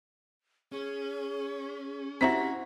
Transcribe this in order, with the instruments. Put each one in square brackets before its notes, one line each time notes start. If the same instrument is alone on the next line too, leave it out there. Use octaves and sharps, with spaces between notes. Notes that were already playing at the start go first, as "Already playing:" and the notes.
[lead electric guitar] C#4 [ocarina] G#4
[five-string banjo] C4 E4 F#4 [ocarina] G4 [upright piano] A#5 B6